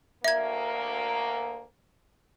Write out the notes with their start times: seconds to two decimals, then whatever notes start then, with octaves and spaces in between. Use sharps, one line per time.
0.24 D2 A#3 E5 G#6